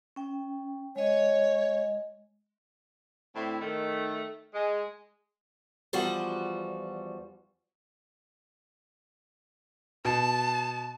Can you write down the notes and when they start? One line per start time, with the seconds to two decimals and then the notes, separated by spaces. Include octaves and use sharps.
0.16 C#4 G5
0.96 G#3 C#5 D#5
3.36 A2 D3 C4 E4
3.61 D#3 A3
4.54 G#3
5.93 E2 F3 G3 F4 F#4 F#5
10.05 B2 A5